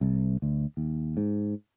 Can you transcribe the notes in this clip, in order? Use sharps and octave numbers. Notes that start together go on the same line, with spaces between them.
C2
D2
D#2
G#2